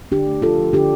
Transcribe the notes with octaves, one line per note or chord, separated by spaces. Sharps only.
D3 D4 G4
A3
F3 F4 A4
F3
D3 D4 G4